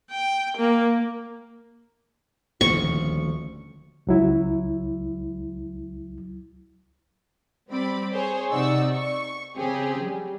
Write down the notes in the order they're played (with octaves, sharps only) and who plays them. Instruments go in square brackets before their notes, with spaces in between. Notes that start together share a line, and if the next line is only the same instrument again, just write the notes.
[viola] G5
A#3
[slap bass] D#1 D2 F3 [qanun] C#6
[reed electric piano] C#2 F#3 E4
[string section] G3 C4 D5 B5 D6
G#4 C5 C#5
C3 D#4 D5 F#5 C#6 E6
C#6
C#3 C4 G4 G#4
F#3 G3